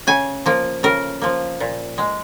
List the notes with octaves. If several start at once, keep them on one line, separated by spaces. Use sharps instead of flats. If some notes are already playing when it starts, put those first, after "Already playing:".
C#3 G#5
F3 A#3
C#3 A#4
F3 A#3
A#2
G#3